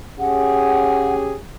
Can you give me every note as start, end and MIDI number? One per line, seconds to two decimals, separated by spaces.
0.19 1.36 61
0.19 1.36 67
0.19 1.36 68
0.19 1.15 78